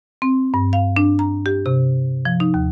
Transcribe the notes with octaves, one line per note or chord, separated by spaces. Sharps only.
C4
G2
F5
D4
A#5
G4
C3
F3
D#4
D#2